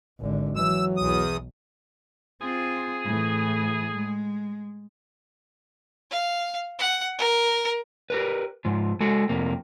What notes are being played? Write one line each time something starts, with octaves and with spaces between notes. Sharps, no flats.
G#1 D3
E3 F#3 E6
B1 E2 D#6
C4 F4 G#4
A2 E3
G#3
F5
F#5
A#4
G4 A#4 B4
G#2 F3
G#3 F#4 A4
F2 C3 A#3